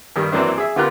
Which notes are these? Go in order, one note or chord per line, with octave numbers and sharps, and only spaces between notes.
G2 D#3 G3
F#2 E3 F#3 A#3 C4 D4
G#4 E5
D3 B3 F4 G4 A#4 F#6